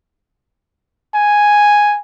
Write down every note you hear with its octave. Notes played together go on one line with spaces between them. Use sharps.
G#5